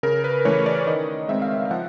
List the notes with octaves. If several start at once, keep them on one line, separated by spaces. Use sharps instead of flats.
C#3 A#4
B4
E3 A3 C#4 C#5
D5
D#3 D#5
G#3 C4 E5
F5
E5
F5
F3 F#5